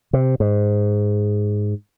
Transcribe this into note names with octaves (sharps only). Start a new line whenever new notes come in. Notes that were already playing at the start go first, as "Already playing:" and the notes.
C3
G#2